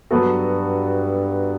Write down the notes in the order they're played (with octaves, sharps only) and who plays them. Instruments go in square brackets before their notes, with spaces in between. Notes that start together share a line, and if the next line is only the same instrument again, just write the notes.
[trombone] G2 [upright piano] F#3 B3 F#4 A4